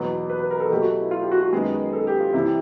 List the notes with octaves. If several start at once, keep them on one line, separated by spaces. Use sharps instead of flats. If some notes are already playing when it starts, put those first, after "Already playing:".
Already playing: E2 B2 F#3 B4
B4
B4
A#4
A4
B2 F#3 A3 G4
F#4
E4
F4
G4
F#4
F#4
F#2 D#3 G#3 B3 G#4
A4
G4
F4
C3 E3 G3 E4